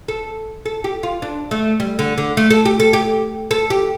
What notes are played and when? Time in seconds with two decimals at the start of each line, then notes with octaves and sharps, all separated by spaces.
0.08 A4
0.66 A4
0.84 G4
1.03 F4
1.22 D4
1.51 A3
1.80 G3
1.99 D3
2.18 D3
2.37 A3
2.50 A4
2.65 G4
2.80 A4
2.93 G4
3.51 A4
3.70 G4